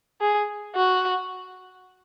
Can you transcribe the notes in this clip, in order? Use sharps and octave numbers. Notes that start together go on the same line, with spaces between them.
G#4
F#4